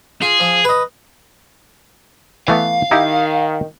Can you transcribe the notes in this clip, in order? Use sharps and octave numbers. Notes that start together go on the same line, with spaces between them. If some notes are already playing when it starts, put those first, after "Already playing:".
F4 G#4
F3
B4 D#5
E3 A3 B3 F5
D#3 D#4 E4 G4